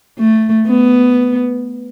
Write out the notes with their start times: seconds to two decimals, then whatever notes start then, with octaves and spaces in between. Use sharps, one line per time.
0.19 A3
0.67 B3